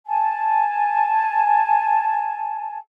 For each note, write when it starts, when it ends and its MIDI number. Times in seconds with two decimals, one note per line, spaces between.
0.07 2.78 80
0.07 2.78 81